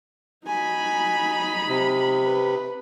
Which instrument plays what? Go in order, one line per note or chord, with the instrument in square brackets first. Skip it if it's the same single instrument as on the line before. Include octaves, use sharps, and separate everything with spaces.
[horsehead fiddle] D#4 B5 [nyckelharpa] F#4 G#5
[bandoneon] C3
[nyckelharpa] B4